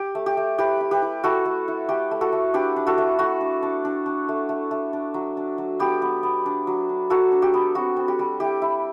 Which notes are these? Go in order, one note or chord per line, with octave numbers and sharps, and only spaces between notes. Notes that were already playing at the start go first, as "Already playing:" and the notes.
Already playing: G4
A3
G4
A3
E4 G4 B4
E4
G4 B4
E4
E4 F#4 A4
A3
E4
A3 G4
A3
F#4 A4
A3
D4 G4 B4
D4
F#4 A4
A3
A3 F#4
D4
D4
D4
D4
A3
A3
A3
D4
F#3
D4
F#3
B3 G4
B3
B3
D4
F#3
D4
F#3 F#4 A4
D4
G4
B3
C4 F#4
C4
G4
G3
E4 G4
E4